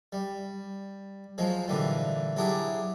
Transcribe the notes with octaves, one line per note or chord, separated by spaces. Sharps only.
G3
F3 F#3 G#3
A#2 D3 E3 G3
F#3 D4 E4 G4 G#4